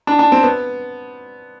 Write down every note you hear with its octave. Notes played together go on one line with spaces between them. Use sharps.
D4
D4
C4
B3